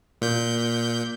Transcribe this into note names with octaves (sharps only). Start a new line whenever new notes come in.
A#2 G6